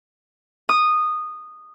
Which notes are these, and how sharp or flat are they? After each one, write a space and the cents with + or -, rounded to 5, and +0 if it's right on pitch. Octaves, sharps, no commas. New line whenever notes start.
D#6 -15